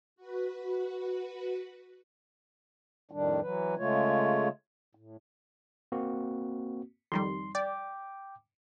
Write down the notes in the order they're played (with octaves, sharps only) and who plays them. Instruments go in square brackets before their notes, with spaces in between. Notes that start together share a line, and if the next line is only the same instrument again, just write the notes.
[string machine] F#4 B4
[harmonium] F2 A2 D#3 G3 D4
E3 F#3 B4
C#3 G#3 A3 F4 C#5
A2
[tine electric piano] A#3 C4 F#4
[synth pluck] F2 D#3 G3 [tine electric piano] C6
[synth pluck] D5 [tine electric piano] G5 D6